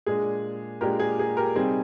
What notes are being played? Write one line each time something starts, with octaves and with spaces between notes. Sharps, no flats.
A#2 G#3 D4 G#4
A#2 G#3 D4 G4 A#4
G#4
G#4
G4 A#4
C3 G3 C4 D#4 G#4